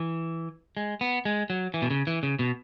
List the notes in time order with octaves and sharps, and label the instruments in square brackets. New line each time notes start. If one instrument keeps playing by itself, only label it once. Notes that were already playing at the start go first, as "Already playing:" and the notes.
Already playing: [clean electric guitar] E3
G#3
B3
G#3
F#3
E3
B2
C#3
E3
C#3
B2